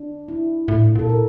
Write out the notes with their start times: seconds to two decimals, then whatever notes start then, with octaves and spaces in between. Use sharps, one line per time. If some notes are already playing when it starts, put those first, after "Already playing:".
Already playing: D4
0.28 E4
0.68 A2 F4
0.95 A#2 A4
1.09 A#4